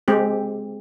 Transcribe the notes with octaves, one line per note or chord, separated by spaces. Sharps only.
G#3 C4 G4